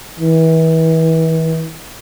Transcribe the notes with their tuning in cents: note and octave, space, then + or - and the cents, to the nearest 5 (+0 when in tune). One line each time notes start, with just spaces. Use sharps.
E3 -30